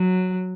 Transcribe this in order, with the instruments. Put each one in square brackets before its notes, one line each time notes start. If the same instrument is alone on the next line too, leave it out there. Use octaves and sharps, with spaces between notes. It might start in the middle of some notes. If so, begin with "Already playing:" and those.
Already playing: [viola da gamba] F#3